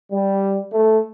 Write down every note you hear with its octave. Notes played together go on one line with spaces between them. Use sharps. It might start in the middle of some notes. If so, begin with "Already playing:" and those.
G3
A3